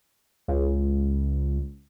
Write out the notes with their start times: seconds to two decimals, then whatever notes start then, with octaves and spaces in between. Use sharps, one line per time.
0.48 C#2